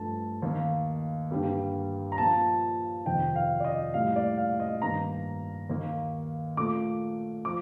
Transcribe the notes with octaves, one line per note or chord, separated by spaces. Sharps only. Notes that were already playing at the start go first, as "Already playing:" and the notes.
Already playing: G2 F3 A3 A5
D#2 D#3 A#3
G2 D3 G3 A#3
A#5
A#2 F3 A#3 A5
F2 C3 D#3 G5
F5
D5
D#5
A2 G3 A#3 F5
D5
F5
D#5
G2 D#3 A#3 A#5
D#2 D#3 A#3
A#2 A3 D6
F3 D6